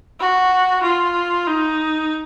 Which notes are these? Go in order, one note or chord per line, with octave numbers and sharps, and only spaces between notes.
F#4
F4
D#4